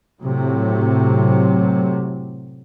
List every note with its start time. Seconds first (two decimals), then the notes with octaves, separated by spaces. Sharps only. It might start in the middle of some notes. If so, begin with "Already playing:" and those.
0.22 A2 C3 F#3